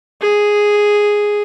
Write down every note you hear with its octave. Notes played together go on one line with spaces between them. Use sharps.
G#4